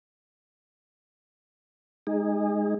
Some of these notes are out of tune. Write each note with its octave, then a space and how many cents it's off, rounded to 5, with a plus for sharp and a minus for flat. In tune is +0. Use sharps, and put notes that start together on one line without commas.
G#3 +0 D#4 +0 G#4 -25